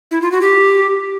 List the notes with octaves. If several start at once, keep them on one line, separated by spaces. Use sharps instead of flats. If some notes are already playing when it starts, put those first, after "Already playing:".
E4
F4
F#4
G4